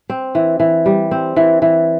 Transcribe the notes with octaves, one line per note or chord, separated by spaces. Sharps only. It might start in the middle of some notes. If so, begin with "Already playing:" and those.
C4
E3
E3
G3
C4
E3
E3